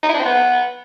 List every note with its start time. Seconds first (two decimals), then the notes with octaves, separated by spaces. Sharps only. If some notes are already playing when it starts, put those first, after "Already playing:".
0.03 D#4
0.09 E4
0.14 D4
0.20 C4
0.25 B3